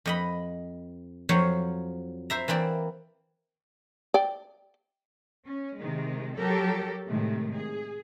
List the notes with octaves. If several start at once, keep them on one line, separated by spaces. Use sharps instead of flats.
F2 D#5 B5
F2 F3 F#3 C5 C#5
C5 E5 A#5
E3 A#3 C4 D5
D5 G5
C#4
C3 D#3 G#3
F#3 G4 A4 A#4
A2 C3 D#3 G#3 A3
G#4